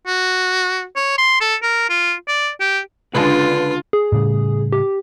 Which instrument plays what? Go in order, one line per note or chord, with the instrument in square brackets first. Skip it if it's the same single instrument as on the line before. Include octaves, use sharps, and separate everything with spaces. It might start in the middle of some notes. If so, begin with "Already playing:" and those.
[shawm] F#4
C#5
C6
A4
A#4
F4
D5
G4
[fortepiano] C#2 G#3 A5 [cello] D3 D4 [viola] F4 [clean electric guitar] B4
[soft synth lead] G#4
[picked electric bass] A2 C#3 G3
[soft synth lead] G4